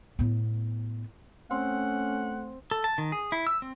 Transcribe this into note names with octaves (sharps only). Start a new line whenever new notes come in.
A2 B3
A3 C4 C#4 F#5
A4
A5
D#3
G#4
E4
E6
C4